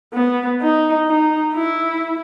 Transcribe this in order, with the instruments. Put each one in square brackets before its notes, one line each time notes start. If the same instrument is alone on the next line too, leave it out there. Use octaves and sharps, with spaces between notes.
[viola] B3
D#4
D#4
E4